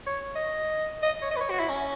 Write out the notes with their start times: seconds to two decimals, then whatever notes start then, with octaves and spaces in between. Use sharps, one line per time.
0.07 C#5
0.35 D#5
1.03 D#5
1.22 C#5
1.31 D#5
1.36 B4
1.41 C#5
1.50 F#4
1.60 E4
1.69 C#4